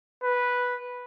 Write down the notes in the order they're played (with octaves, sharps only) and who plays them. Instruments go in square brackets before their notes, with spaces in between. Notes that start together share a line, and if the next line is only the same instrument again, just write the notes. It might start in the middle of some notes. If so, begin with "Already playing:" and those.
[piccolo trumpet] B4